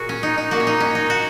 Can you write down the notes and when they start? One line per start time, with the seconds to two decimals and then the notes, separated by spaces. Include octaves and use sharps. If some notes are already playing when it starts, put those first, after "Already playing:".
Already playing: A#2 F#4 G#4 A#4
0.09 C#4
0.23 D#4
0.38 D#4
0.51 A#2 A#3 F#4
0.60 C#4
0.67 D#4
0.80 C#4
0.95 D#4
1.10 F#4